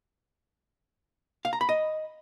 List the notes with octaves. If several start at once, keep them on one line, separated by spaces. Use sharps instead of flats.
F5
A#5
B5
D#5